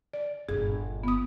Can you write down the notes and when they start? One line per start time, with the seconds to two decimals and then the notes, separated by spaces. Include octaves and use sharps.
0.14 D5
0.49 G1 A#2 G#4
1.04 B3 D#6